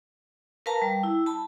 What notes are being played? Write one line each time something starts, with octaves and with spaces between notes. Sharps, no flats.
A#4 B4 F5 A5 A#5
G3
E4
A5 B5